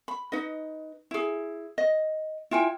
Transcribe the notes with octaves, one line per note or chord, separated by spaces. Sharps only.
B5
D#4 B4 D#5
E4 G#4
D#5
E4 F4 G5 G#5